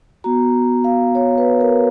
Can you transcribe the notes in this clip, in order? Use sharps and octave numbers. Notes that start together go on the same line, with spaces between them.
B3 F#4 A#5
F5
C#5
B4
A#4